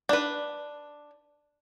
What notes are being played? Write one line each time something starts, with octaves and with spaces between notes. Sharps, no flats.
D4 B4